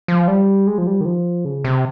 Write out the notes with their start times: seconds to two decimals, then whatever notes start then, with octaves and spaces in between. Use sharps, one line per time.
0.08 F3
0.28 G3
0.67 G#3
0.78 F3
0.87 G3
1.01 D#3
1.05 F3
1.45 C#3
1.64 C3